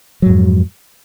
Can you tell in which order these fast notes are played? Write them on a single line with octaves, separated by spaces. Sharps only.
F#3 G#2 F2